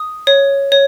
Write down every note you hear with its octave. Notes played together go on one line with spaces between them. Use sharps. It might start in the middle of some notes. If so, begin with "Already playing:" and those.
Already playing: D#6
C#5
C#5